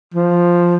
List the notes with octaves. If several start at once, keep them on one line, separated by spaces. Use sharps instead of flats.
F3